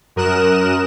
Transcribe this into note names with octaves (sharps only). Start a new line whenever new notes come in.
F#2 A#4 D#6 F#6 E7